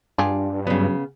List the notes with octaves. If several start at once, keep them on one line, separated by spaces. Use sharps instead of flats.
G2 D4 F4 G4 G#4
C#3 F#3 B3